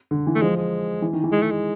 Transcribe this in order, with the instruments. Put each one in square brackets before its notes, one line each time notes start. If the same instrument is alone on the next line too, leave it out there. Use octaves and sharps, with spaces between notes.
[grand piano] D3
E3
[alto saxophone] A3
[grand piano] F3 [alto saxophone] G#3
[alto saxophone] G#3
[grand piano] E3
D#3
E3
[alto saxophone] G#3
A3
G#3